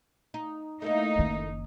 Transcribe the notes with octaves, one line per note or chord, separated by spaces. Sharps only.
D#4
A3 A#3 D#4 E4 D#5
F#1 D#3